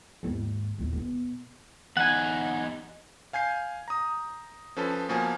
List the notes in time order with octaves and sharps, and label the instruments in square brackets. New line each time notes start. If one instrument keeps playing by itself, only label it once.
[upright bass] D#2 G#2
A#1 D#2
B2 B3
[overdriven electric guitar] E2 D#4 [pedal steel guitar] F#5 G#5
[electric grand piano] F5 G#5 G6 C7
A#5 D#6
F3 C#4 A4 B4 A5
B2 F3 A#3 G#5